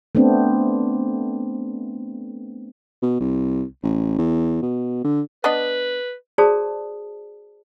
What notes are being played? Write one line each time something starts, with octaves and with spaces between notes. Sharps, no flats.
A3 B3 C4 D4
B2
C2
A1
E2
B2
D3
B3 D4 B4 D#5
F#4 G#4 C5 D5 A5 D#6